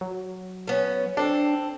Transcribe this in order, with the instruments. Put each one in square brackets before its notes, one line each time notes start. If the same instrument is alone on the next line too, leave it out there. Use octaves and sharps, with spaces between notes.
[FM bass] F#3
[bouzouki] A3 B3 C#4
[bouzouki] C4 A4 [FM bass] D4